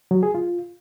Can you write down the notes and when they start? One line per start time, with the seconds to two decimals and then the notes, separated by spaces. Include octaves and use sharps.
0.11 F#3
0.23 G#4
0.35 F4